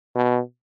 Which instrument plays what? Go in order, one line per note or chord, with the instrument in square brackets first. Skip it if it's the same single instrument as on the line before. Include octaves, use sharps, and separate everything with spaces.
[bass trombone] B2